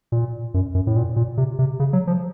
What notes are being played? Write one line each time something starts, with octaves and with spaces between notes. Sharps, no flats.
A#2
F#2
F#2
A2
A#2
A#2
C3
C3
C#3
F#3
F3